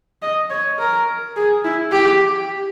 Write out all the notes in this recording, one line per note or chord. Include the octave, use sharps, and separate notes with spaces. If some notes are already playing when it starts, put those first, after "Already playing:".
D#5
C#5
A#4
G#4
E4
G4